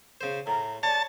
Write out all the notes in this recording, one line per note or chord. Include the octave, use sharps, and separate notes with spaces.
C#3 C5
A2 A#5
C#5 D5 A5